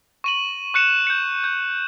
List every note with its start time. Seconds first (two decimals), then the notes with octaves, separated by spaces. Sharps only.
0.24 C#6 D#7 F#7
0.74 C#6 F#6 C#7 E7
1.07 G6 C#7
1.44 G6